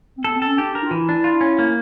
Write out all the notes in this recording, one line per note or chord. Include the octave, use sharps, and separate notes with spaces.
C4
B3 A4
C4
C#4 A4
D4 G4
A#4
F4
E3 E4
D4
F4
C#4
A#3